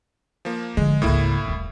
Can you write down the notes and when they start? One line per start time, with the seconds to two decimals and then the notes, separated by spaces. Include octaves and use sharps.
0.45 F3 A#3
0.77 D3 F3 G#3
1.02 G#1 C#2 A2 A#3 E4
1.48 D#1 A#1